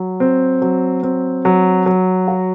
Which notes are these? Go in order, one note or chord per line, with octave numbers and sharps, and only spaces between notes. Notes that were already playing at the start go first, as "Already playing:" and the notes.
Already playing: F#3
C4
F#3
C4
F#3
F#3
F#4